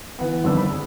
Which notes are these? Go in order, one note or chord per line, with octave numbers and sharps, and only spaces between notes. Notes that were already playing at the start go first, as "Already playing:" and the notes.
E3 B3
G1 F2 D#3 D4 B4 E6
B5
G#4